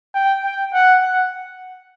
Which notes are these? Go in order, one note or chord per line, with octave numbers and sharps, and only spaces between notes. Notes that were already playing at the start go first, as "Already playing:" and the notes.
G5
G5
F#5
F#5